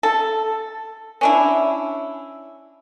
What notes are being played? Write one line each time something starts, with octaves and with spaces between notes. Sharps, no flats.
A4
C#4 D4 E4